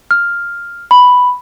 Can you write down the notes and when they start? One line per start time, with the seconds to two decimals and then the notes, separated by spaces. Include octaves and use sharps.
0.11 F6
0.91 B5